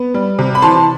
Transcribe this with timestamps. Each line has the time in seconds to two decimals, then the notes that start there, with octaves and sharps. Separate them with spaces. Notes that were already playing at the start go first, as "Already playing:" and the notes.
Already playing: B3
0.14 G3
0.39 C3
0.55 B5
0.62 E3 A5 C6